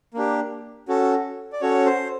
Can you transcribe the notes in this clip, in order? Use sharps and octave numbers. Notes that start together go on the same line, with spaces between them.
A#3 D4 G4
C#4 F#4 A4
D5
C#4 F#4 A4 C#5
C5